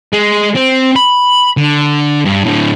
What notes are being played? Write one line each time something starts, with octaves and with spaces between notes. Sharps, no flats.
G#3
C4
B5
D3
G2
A2 D3